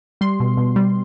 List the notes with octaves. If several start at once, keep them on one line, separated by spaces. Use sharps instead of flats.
G3 C6
B2
B2
G3